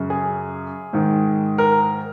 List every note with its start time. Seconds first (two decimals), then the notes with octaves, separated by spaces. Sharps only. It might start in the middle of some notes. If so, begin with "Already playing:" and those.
Already playing: F#2 C#3
0.10 G#4
0.93 G#2 D#3
1.58 A#4